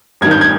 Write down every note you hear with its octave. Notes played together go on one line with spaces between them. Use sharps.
G#1 G2 D#3 G#6
G6
G#6